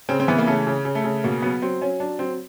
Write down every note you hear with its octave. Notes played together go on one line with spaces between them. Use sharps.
C#3 C4
C4
E3 B3
A#3
C#3 A3
C#3
C#3
A3
C#3
B2 A#3
F#3 B3
F#3 C4
F#3 C#4
F#3 D4
F#3 C4